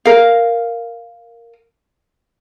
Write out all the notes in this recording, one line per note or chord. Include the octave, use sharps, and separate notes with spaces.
A#4 F5